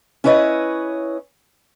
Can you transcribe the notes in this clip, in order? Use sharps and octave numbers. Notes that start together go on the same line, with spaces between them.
C#4 E4 B4 C#5 D#5